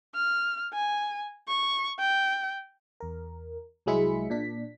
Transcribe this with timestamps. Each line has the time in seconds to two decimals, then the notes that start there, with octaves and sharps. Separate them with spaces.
0.15 F6
0.73 G#5
1.48 C#6
1.99 G5
3.00 E2 A#4
3.86 C2 F#3 G#3 E4 B6 C#7
4.30 A#2 D4 B6